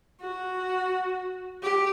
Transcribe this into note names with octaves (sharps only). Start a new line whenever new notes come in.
F#4
G4